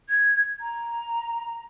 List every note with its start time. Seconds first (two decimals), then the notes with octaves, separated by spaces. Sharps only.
0.09 G#6
0.61 A#5